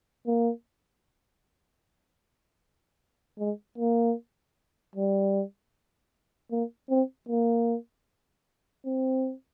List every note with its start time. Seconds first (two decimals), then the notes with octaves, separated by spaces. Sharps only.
0.27 A#3
3.39 G#3
3.78 A#3
4.96 G3
6.52 A#3
6.90 C4
7.29 A#3
8.86 C4